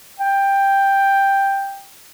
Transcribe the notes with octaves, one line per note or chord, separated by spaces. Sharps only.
G5